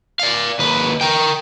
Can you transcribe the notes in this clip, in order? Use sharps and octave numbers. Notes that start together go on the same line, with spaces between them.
D5 F5
D#2 B4
A#4 G5